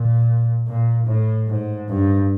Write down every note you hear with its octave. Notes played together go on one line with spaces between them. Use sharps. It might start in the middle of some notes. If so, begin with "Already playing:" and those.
Already playing: A#2
A#2
A2
G#2
G2